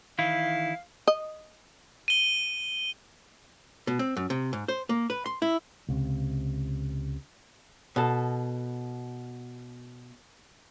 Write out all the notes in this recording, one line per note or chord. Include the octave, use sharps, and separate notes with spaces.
D#3 E3 E4 F5
D#5
D#7 G7
B2
C4
F#2
C3
G#2
C5
A#3
B4
C6
E4
C#2 C3
B2 A4